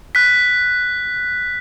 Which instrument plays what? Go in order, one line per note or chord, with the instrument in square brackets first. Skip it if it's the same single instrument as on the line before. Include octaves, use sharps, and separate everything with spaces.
[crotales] F#6 B6